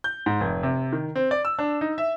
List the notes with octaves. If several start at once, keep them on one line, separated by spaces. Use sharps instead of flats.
G6
G#2
F1
C3
D#3
C4
D5
E6
D4
D#4
E5